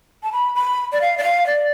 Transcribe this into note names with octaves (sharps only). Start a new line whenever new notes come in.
A5
B5
B5
D5
F5
D5
F5
D5